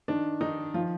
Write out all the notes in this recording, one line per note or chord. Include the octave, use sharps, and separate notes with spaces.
D#3 D4
D#3 D#4
F3 F4